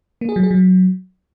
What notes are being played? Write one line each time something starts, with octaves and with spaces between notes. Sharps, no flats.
A#3
G#4
F#3
G#4
F#3